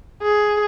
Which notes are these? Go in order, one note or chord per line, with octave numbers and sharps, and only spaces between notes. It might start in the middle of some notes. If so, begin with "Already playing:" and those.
G#4